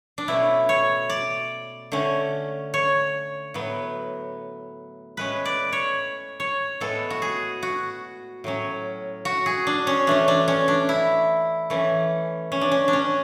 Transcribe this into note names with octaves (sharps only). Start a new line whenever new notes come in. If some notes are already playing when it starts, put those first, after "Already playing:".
D4
B2 A3 C#4 E4
C#5
D5
D3 A3 C#4
C#5
A2 F#3 B3
A2 G#3 C#4 B4
D5
C#5
C#5
A2 G#3 B3 A4
F#4
G#4
F#4
A2 F#3 C#4
F#4
G#4
D4
C#4
E3 A3 C#4 D4
D4
C#4
D4
E4
E3 A3 C#4
C#4
D4
C#4
D4
C#4